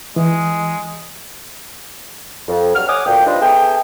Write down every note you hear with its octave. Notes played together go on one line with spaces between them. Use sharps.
E3 G#3
F2
G2 F#3 F#4 F6
C#5 F#5 G#5 D6 D#6
D2 A#2 D5 G5
G3 D4 F4 B4 C5 D#5
B3 G#4 A4 E5 G5